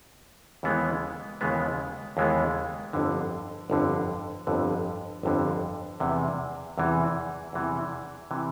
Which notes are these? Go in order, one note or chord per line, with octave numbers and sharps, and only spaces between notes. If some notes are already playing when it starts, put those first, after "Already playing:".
D#2 C#3 E3 G#3 B3
D#2 C#3 E3 G#3 B3
D#2 C#3 E3 G#3 B3
G1 F2 D3
G1 F2 D3
G1 F2 D3
G1 F2 D3
E2 C3 E3
E2 C3 E3
E2 C3 E3
C3 E3